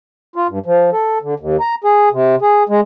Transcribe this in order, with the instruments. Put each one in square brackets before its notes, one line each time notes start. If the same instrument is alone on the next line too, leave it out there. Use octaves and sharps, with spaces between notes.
[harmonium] F4
G2
F3
A4
D3
D#2
A#5
G#4
C3
G#4
G#3